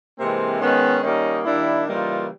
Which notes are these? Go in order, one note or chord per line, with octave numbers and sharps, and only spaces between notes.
C3 E3 G#3 A#3 C4
D#3 G#3 B3 C#4
D#3 G3 A#3 C#4 D#4
D#3 G3 A#3 D4 E4
C#3 E3 G3 A#3 D#4 F4